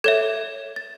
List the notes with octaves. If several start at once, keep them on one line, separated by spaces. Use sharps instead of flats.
A4 C#5 E5 G#6
A6